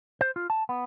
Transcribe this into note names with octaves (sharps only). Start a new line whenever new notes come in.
C5
F4
A5
B3